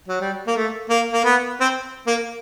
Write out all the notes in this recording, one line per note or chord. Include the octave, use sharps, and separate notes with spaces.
F#3
G3
A#3
A3
A#3
A#3
B3
C4
A#3